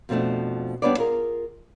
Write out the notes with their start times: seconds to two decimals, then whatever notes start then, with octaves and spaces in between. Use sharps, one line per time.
0.09 F2 B2 F3 A3 D4
0.82 G3 B3 D4 B4 C#5 D5
0.97 F4 G#4 A#4